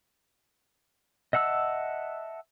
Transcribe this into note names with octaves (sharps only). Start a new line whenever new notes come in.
D#5 E5 F#5 A5 E6